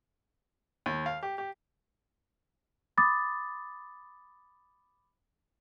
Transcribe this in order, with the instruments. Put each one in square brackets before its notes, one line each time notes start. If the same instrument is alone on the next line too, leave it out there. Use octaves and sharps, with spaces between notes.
[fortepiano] D#2
F5
G4
G4
[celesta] B5 D6 D#6 A6